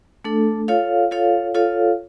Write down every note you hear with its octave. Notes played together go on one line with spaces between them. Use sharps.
A3 D4 A4
F4 A4 C#5 F5
F4 A4 C#5 F5
F4 A4 C#5 F5